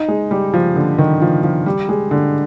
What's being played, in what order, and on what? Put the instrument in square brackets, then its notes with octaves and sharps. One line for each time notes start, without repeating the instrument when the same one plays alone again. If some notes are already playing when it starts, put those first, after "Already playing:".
Already playing: [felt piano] D#4
G#3
G3
F3
D3
D#3
F3
F3
G3
G#3
D3